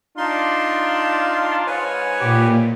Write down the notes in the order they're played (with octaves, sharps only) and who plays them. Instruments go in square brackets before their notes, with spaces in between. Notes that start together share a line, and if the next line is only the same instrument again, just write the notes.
[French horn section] D4 [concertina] D#4 C6 [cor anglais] F4
[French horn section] G#2 C#5 [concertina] B4 G#5
[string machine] A#2 [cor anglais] G4